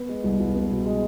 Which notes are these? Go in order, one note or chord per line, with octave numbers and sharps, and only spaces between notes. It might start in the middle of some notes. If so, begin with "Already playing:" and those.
Already playing: B3
G#3
C2
C2
B3
B2
G#3